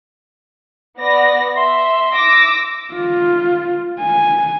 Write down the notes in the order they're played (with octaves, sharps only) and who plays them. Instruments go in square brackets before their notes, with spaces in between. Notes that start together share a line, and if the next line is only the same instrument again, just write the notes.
[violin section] B3 D5 A#6
[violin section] E5 [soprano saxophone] C6
[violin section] D6 E6 A#6
[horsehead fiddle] F4
G#5